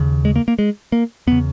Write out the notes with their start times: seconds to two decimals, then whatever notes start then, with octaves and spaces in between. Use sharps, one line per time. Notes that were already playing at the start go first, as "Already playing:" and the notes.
Already playing: D#2 C#3
0.25 G#3
0.36 A#3
0.48 A#3
0.59 G#3
0.92 A#3
1.27 E2 C#3 B3